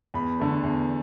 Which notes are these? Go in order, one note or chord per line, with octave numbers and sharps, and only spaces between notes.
E2 B5
D3 A3
E2